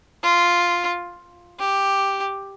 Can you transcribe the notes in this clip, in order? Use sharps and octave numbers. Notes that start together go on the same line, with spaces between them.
F4
G4